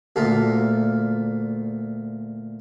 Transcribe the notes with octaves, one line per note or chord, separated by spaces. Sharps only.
D2 A#2 F4